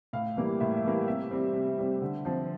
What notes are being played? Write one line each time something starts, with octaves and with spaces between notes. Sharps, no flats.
A2 F5
E3 G3 A#3
A2 E5
E5
E3 G3 A#3
C3 E5
G3 C4
C3
G3 C4
D3
F3 C4